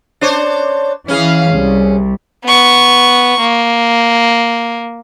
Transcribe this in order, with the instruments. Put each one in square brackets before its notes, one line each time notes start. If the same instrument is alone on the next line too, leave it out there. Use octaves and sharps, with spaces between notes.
[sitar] D4 C5 C#5
[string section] E3 F5 [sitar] C#4 G#4
[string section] C2
[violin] B3 C#6
A#3